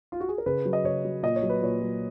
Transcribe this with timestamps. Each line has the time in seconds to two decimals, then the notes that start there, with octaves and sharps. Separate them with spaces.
0.12 F4
0.20 F#4
0.29 G#4
0.38 A#4
0.46 C#3 B4
0.65 F#3
0.73 D#5
0.84 C#3 C#5
1.05 F#3
1.23 A#2 D#5
1.36 C#5
1.43 F#3
1.49 B4
1.62 A#2 C#5
1.82 F#3